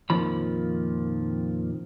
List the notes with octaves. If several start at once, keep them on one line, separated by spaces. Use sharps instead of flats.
F2 A#2 D#3 F3 B5